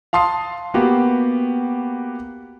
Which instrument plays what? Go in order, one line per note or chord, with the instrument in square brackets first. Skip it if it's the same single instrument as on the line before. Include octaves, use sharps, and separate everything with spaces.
[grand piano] F5 A5 C6 D#6 C7
A#3 B3 F#4 G4